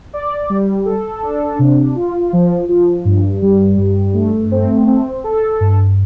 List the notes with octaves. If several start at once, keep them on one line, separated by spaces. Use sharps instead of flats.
D5
G3
A4
D4
C3
F4
F3
F3
G2
G3
G2
A3
C4
C4
A4
G2